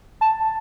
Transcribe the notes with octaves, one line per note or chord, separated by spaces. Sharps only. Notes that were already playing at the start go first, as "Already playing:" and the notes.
A5